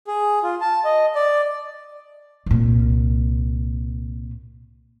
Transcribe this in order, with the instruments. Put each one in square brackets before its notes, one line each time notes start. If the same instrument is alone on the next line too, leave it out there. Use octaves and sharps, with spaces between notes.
[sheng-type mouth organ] G#4
F4
A5
D#5
D5
[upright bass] C2 A#2